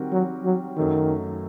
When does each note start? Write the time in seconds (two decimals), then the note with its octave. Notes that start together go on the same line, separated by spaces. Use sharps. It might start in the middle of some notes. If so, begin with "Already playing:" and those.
Already playing: D#3 G3 C4 F#4 A#4
0.12 F#3
0.45 F#3
0.77 F#2 D#3 F#3 A3